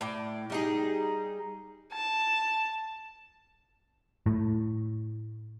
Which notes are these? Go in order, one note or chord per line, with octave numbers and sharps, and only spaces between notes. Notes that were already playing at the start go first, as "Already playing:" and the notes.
A2 D5
G3 D#4 G#4
A5
A2